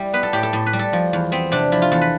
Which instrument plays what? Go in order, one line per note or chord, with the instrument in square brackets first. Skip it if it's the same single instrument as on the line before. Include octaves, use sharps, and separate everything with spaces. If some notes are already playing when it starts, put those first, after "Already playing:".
Already playing: [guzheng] G3 E4 G4
B3 B4
A4
A2 G4
A4
A2
B4
G3
A4
F3
E2
B3 C4
C3 D4
F3 E4
F4
E2 A4
B4